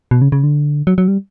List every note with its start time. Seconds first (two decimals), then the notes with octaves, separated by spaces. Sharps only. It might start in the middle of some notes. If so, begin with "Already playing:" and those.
0.11 B2
0.22 C#3
0.32 C#3
0.44 D3
0.87 F#3
0.98 F#3
1.08 G3